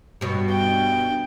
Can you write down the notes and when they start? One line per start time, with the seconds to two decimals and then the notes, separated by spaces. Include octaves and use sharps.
0.21 G2 B2
0.51 G5